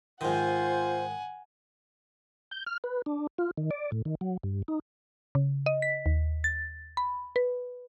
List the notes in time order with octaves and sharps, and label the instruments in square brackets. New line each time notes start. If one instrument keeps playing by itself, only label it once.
[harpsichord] G#2 D#3 [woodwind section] F4 C5 [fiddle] F#5 G#5
[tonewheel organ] G6
F6
B4
D4
F4
D#3
D5
A2
D#3
F#3
G2
D#4
[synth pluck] C#3
D#5
B6
D#2
A6
B5
B4